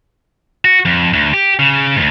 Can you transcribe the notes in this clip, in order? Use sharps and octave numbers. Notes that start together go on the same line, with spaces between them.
F#4
F2
D2
G4
C#3
D2 G#2